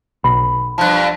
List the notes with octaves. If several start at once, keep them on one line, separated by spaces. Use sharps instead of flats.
B1 B5
G2 F3 A5 F#6